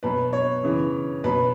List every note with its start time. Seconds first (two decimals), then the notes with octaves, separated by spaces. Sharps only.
0.03 B2 F#3 B4
0.33 C#5
0.63 C#3 E3
1.24 B2 F#3 B4